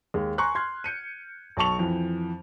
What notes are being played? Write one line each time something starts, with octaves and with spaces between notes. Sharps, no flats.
D#2 G#3
G#5 A#5 C6 C#6 F#6
C6 F6 G#6
G6 C#7 D#7
B1 A4 A5 C#6 F7
F2 E3